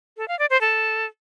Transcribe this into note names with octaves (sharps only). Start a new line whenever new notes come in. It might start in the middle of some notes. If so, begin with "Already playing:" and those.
A4
F5
D5
C5
A4